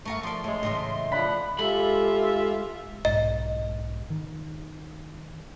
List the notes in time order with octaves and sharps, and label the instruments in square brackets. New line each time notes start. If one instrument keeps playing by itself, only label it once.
[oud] A3 A#4 F5 [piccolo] C#6
[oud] F3 D5 [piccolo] C6
[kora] G#3 A3 [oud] C#4
[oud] A2 C#3 E3 [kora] D#5
[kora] D3 F3 [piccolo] F#5 [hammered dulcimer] B5
[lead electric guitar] G#3 B5 [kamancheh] F4 E5 [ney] G4 [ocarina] A4
[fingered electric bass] B1 G#2 [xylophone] D#5
[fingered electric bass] D#3